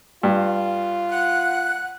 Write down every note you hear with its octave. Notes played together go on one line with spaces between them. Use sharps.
G2 F4
F#5 F#6